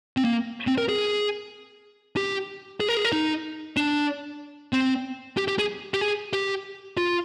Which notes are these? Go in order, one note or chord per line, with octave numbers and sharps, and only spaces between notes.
C4
A#3
C4
A#4
G#4
G4
G#4
A#4
G#4
A#4
D#4
D4
C4
G4
G4
G#4
G4
G#4
G4
F4